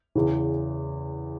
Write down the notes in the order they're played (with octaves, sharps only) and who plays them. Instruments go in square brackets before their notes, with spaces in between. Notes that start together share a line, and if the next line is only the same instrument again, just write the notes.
[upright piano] E2 C#3 E3